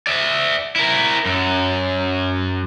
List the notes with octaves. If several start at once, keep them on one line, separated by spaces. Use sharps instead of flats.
D5 E5
E4 A#4
F#2